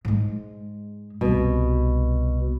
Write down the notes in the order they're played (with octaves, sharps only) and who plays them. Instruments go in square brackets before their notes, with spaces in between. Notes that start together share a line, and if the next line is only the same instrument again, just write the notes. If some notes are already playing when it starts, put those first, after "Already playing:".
[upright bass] G#2 G#3
[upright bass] C2 [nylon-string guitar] B2